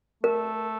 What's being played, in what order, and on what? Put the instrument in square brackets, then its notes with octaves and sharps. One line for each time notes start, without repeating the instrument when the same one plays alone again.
[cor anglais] A3 [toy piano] A#4